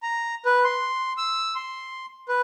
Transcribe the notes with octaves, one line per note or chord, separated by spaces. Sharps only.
A#5
B4
C6
E6
C6
B4